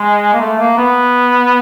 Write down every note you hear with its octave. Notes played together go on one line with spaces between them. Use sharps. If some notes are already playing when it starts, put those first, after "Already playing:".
Already playing: G#3
A#3
A3
A#3
B3